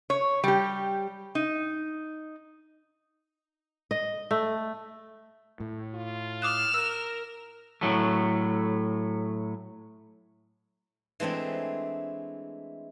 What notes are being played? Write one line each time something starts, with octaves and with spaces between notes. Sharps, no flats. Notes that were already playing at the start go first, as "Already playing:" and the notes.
C#5
G3 G4
D#4
D#5
A3
A2
F4
D6 D#6 F6 F#6 E7
A#4 E6
A2 F#3 A3
E3 G#3 A3 C4 D4